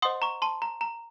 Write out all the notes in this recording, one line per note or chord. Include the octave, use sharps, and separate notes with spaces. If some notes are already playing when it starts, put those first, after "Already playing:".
C5 D#5 F#5 C6 D#6
A#5 C#6
A5 C6
A#5
A#5